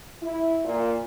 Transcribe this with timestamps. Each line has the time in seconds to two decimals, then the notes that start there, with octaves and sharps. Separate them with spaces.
0.23 E4
0.65 A#2